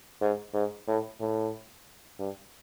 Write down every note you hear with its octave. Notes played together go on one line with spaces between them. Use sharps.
G#2
G#2
A2
A2
G2